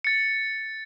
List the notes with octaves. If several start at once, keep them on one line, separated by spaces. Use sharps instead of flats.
A6 C#7